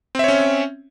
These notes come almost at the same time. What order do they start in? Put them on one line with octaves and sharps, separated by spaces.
C4 E5 C#5 C#4